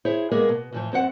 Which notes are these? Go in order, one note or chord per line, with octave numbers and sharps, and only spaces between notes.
E4 G#4 C5 C#5
G#3 A#3 B3 G#4 A#4
B2
A2 E3 F3
F#2 C4 A4 F#5